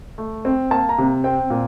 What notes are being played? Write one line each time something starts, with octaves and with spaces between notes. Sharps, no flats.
A3
C4
A#3 A5
A#5
C3
C4 G5
A#2